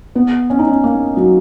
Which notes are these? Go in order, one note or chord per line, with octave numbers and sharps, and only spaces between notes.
B3
C#4
D#4
C#4
A#3
F#3